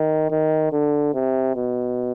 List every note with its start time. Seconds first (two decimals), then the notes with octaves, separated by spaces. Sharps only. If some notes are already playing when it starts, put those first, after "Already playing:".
Already playing: D#3
0.31 D#3
0.72 D3
1.14 C3
1.56 B2